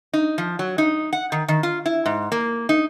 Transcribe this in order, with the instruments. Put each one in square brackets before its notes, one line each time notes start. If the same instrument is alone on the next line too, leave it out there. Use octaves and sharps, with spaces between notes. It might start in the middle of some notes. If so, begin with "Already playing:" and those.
[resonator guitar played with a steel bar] D#4
F3
F#3
D#4
F#5
D#3
D#3
F4
E4
G#2
A#3
D#4